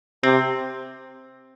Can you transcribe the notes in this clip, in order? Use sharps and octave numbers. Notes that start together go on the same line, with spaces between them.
C3 C4